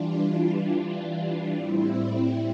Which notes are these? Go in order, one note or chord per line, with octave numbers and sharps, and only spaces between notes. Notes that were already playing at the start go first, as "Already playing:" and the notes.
Already playing: E3 G3 D4 F4
A2 G3 C4 E4